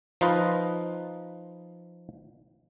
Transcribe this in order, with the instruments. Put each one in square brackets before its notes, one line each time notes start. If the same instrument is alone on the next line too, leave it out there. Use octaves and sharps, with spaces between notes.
[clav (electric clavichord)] F3 D#4 F4 B4 D#5